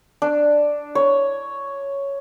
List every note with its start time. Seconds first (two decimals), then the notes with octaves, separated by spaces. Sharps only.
0.22 D4
0.95 C#5